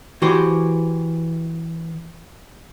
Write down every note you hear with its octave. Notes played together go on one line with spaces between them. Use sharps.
E3 F#4 G4 C5